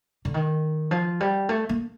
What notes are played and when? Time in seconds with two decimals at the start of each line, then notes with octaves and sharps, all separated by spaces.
0.25 D3
0.34 D#3
0.91 F3
1.20 G3
1.49 A3
1.69 A#3